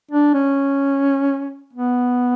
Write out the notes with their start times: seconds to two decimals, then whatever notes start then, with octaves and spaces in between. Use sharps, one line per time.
0.11 D4
0.34 C#4
1.73 B3